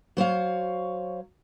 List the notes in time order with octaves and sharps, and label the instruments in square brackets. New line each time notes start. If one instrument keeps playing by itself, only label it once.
[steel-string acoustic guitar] F#3 C5 C#5 F5